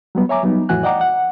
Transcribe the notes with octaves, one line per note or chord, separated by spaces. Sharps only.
F#3 G3 B3
C#5 E5 G#5 A#5 D6
F#3 G3 B3 D#4
F2 A2 E3 F#4 G#5 F#6
D5 D#5 F#5 G5 A#5 D6
F#5